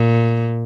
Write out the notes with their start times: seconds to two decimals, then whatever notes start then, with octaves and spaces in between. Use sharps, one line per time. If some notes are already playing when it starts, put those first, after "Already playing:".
Already playing: A#2